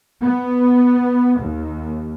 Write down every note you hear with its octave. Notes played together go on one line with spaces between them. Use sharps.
B3
D#2